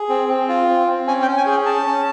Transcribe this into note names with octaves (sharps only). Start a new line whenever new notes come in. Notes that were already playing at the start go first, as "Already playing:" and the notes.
Already playing: G#4
C4
C4
F4
C4
C4
C#4 G#5
G5
C#4
G#5
G#4
G5
C#4 A5
C#4